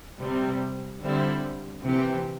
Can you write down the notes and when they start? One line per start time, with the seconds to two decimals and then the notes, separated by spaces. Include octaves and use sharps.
0.20 C3 G3 C4
1.01 D3 G3 C4 E4
1.83 C3 E3 C4 G4